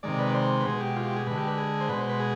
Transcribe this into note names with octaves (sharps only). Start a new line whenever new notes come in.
C3 D#3 G#3 D5
B4
D5
C5
B4
B2 G#3 G#4
G4
F4
G4
G#4
D3 G#3 B4
G4
B4
G#4
C5
B2 G#3 B4
C5
B4
G#4